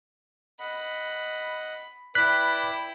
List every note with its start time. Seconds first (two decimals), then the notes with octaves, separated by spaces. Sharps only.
0.60 D#5 F#5 B5
2.15 E4 B4 D5 G5 F#6 B6